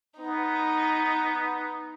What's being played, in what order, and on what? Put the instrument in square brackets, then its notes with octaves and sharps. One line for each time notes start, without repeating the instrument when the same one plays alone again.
[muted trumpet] B3 [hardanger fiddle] D#4